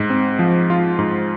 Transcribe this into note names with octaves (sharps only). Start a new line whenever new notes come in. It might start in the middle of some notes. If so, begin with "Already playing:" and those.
Already playing: G#2
C4
F3
F4
G#2